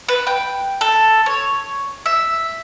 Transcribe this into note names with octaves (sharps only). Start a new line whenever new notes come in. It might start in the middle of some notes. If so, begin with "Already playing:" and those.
B4
G5
A4
C#5
E5